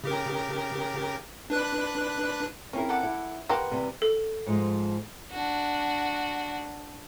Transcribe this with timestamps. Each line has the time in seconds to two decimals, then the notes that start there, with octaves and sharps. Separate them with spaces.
0.04 C#3 G4 A#4
1.50 D4 B4 F#6
2.73 C4 C#4 E4 A#4
2.89 A4 F#5 D6
3.03 E4
3.49 A#3 G4 B4 C5 F#5
3.71 C3 E3 G3
4.02 A4
4.46 G#2 F3 G#3
5.31 D4 F#4